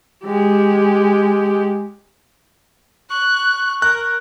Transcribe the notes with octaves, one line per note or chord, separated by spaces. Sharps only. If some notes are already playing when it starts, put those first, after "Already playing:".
G#3 G4
C#6 F#6
A#4 F#6